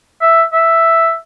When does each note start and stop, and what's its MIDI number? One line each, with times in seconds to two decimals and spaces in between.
0.22 0.43 76
0.53 1.14 76